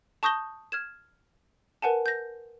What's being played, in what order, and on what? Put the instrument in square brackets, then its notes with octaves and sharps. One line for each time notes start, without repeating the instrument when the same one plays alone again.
[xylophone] A5 C#6 D#6 G6 A#6 G7
F6 G#6 E7
A#4 B4 F#5 G#5 A5
G6 A#6